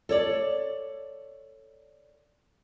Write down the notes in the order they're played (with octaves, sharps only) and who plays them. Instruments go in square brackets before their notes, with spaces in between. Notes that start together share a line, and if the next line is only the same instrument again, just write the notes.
[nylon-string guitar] A4 C#5 D5